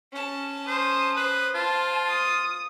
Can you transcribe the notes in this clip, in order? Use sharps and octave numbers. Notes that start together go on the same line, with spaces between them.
C#4 A5
C5 D#6
B4 C5
F4 A5
D#6